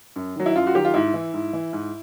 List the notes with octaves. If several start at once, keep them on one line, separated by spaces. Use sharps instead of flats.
F#2
D#3 F#3
E4
F#2 F4
F#4
D#3 F#3 G4
F4
G#2 E4
E3
G#2
E3
G#2